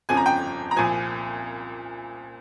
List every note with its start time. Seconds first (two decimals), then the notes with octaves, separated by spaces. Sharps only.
0.09 G1 F2 C#3 F3 G#5
0.17 A#5
0.26 G5
0.71 A#5
0.76 C2 A#2 F3 G#5